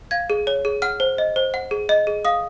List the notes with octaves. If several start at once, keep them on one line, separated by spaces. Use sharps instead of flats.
F5 G#6
G#4
C#5
G#4
F#5 F6
C5
D#5
C5
F#5
G#4
D#5
G#4
F5 D#6